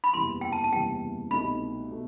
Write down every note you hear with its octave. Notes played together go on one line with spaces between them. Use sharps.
B5
F#1 E2 C3 E3 G3 C6
G5
A5
A5
F#1 E2 C3 E3 G3 G5
C2 B2 A3 D#4 B5
B2 A3